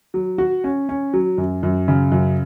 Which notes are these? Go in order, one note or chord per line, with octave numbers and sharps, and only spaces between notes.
F#3
F#4
C#4
C#4
F#3
F#2
F#2
C#3
F#2